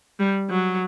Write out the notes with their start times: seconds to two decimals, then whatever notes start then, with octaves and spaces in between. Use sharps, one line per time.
0.19 G3
0.50 F#3